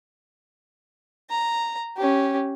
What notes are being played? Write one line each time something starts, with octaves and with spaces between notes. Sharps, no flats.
A#5
C#4 G4